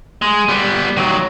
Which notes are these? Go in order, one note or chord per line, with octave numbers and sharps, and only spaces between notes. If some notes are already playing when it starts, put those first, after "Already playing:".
G#3
G3 B3
D#3 F#3